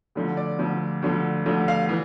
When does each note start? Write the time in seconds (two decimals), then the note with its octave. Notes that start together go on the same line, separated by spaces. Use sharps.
0.15 D2 D3 F3
0.37 D5
0.59 D2 D3 F3
1.02 D2 D3 F3
1.46 D2 D3 F3
1.68 F5
1.89 E3